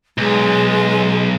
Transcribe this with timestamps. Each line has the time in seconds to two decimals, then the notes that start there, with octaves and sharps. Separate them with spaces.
0.18 B1 G#3